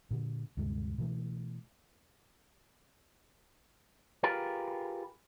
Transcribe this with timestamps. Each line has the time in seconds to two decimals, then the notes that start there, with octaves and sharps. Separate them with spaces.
0.11 A#2 D3
0.57 D2 G2 C3 G#3
0.98 B2 E3 A3
4.23 F4 G4 G#4 A#4 B4